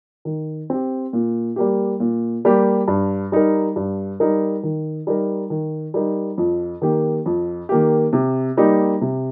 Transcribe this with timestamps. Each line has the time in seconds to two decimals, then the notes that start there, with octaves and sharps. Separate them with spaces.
0.25 D#3
0.70 C4 G4
1.13 A#2
1.56 G3 A#3 G4
2.00 A#2
2.45 G3 A#3 G4
2.88 G2
3.32 G3 D#4 A#4
3.76 G2
4.20 G3 D#4 A#4
4.63 D#3
5.07 G3 D#4 A#4
5.50 D#3
5.94 G3 D#4 A#4
6.38 F2
6.82 D#3 A#3 G4
7.26 F2
7.69 D#3 A#3 G4
8.13 C3
8.57 G3 A#3 D#4 G4
9.01 C3